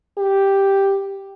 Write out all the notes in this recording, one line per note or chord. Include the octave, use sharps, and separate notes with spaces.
G4